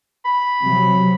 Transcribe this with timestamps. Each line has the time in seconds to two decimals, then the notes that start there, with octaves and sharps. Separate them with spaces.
0.25 B5
0.63 C3 F#3